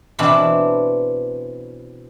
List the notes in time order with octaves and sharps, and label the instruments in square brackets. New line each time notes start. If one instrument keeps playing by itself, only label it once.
[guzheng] B2 E3 C4 D4 A5 B5